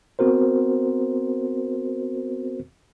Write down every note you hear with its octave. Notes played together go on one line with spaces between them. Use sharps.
B3 C4 F#4 A#4 C5